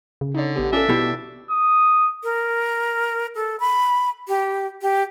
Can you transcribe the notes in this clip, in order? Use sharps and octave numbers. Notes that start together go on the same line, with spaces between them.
C#3
D3 D#4 C#5
A1 B3 G4
C#4 D4 F4 A4 E5
B2 E4 G4
D#6
A#4
A4
B5
G4
G4